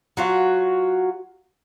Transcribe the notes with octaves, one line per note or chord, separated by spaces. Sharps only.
F#3 F4 F#4